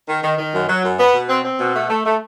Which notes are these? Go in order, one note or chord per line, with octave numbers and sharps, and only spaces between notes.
D#3
D#3
D#3
F#2
F#3
F#2
B3
B2
C4
C4
B2
A3
A3
A3